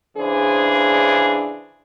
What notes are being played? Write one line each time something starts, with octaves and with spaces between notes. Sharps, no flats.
C#3 E3 D4 G#4 C5